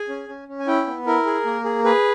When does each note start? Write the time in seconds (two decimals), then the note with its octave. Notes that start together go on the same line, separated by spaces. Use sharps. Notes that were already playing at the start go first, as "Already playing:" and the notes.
Already playing: G#4 G#5
0.09 C#4
0.29 C#4
0.48 C#4
0.60 G#5
0.67 E4 G5
0.87 B3
1.06 E4 A#4
1.26 G#4
1.45 A#3
1.64 G#4
1.84 G#4 B4